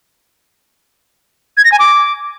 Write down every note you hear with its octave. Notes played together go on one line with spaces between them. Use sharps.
G#6
A#6
G#5
D6